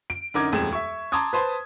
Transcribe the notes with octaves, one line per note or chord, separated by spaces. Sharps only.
D7
F#2 D3 D#4 A#4 D6 G#6
D#1 F2 G#3 G#6 E7
E5 C#6
A5 A#5 C6 D6 D#6 G#6
B4 C5 A5 C6